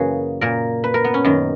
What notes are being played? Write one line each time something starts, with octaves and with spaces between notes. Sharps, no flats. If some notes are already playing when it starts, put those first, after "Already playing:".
Already playing: F#2 C#3 E3 A#3 F#4 G#4
A#2 A#4
B4
A#4
B3
C#4
F#2 D#3